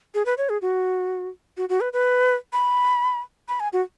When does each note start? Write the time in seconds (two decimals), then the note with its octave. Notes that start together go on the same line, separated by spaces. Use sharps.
0.14 G#4
0.26 B4
0.38 C#5
0.49 G#4
0.62 F#4
1.57 F#4
1.69 F#4
1.81 B4
1.93 B4
2.53 B5
3.48 B5
3.60 G#5
3.73 F#4